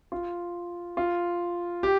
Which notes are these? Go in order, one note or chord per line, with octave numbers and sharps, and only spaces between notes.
F4
F4
G4